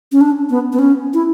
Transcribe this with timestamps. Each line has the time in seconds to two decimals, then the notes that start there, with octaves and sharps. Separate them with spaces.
0.12 C#4
0.21 D4
0.50 B3
0.73 B3
0.79 C#4
1.14 E4